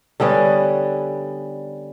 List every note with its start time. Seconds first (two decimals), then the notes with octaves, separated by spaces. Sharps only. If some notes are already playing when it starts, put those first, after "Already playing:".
0.20 D3 G3 B3 C#4